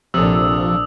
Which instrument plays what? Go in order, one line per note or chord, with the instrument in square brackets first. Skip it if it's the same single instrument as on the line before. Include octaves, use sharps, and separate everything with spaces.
[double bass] A#1 D4 [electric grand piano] C3 A4 [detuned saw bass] F3 [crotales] D#6 E6